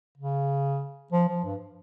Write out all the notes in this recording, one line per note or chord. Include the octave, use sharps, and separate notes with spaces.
C#3
F3
F3
G2